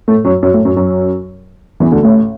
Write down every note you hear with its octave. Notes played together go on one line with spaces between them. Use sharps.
A2 A3
F#2 F#3
F#2 F#3
A2 A3
F#2 F#3
F#2 F#3
E2 E3
D2 D3
A1 A2